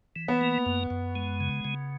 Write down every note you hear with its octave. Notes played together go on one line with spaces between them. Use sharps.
E3
B3
A#3
F#2
F#2
G#3
C#3
C#3